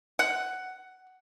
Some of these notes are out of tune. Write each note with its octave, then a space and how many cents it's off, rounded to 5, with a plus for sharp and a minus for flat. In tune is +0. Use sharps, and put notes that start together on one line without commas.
F#5 +10